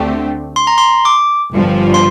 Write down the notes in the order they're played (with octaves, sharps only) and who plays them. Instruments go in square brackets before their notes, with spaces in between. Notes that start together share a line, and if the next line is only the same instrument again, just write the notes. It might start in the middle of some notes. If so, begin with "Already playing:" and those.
Already playing: [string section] D2 D3 A3 C4 G4
[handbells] C6
A#5
C6
D6
[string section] G1 G2 F3
[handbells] C6